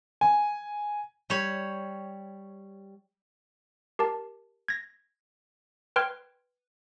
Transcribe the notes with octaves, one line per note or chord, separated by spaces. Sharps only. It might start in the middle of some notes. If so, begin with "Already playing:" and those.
G#5
G3 C#5
G4 A#4 A5
G#6 A#6
B4 G5 C6 F6 G#6